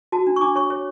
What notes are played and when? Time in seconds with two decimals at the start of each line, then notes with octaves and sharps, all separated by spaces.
0.12 F#4 A5
0.27 D4
0.36 C#6
0.41 D4 D6
0.56 C#5 C#6
0.70 C#5